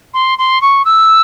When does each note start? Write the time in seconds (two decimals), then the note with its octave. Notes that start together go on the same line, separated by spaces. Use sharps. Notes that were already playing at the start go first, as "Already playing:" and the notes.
0.14 C6
0.38 C6
0.61 C#6
0.85 E6